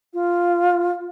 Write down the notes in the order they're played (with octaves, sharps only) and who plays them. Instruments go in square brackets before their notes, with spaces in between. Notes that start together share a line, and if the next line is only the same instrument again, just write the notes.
[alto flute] F4